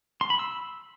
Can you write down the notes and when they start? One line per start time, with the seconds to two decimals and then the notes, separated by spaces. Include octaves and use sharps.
0.21 C6
0.30 B5
0.39 E6